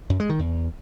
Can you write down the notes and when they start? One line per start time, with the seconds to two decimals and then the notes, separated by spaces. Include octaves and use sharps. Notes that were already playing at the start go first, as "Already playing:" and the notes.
0.10 F#2
0.20 G#3
0.30 D#3
0.39 E2